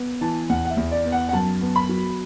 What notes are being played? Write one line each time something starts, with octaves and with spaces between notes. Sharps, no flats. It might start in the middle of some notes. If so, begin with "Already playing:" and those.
Already playing: B3
E3 A5
E2 F#5
F#5
E5
E2
D5
B3
F#5
F#5
F#2 A5
B3
B5
F#3